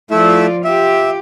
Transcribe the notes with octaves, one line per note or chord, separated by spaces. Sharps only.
F3 A3 E4 F4 D5 E5
F4 G4 E5